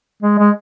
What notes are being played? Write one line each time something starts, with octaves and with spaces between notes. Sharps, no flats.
G#3
G#3